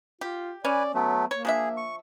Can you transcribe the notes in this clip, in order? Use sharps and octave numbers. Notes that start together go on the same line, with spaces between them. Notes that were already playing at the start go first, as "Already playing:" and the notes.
F4 G4
C#4 B4 D5 G#5
F#3 A3 B3
A#3 C#5
F3 D4 G#4 E5
C#6